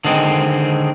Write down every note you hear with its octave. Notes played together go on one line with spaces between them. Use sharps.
D3 D#3 G#3 C4